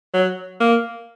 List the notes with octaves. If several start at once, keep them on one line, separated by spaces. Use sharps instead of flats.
F#3
A#3